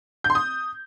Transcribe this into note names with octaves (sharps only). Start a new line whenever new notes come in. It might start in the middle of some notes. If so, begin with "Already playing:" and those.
G6
C6
D#6